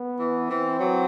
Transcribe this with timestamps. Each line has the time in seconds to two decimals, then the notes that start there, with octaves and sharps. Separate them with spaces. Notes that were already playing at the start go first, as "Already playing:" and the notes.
Already playing: B3
0.19 E3
0.50 E3 C4
0.80 F#3